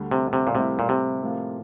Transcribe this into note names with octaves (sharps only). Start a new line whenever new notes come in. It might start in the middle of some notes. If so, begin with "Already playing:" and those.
Already playing: D2 D3 G3
C3
C3
A#2
A2 C3 G3 A#3 E4
A#2
C3
A2 F3 A#3 F4